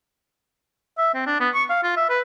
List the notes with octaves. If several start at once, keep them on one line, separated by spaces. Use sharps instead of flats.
E5
C4
D4
B3
C#6
F5
F4
E5
B4